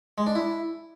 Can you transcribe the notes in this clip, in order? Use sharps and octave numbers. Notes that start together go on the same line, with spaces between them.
G#3
D4
E4